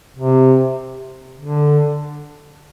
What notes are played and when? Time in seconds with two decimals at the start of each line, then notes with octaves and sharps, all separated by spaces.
0.16 C3
1.40 D3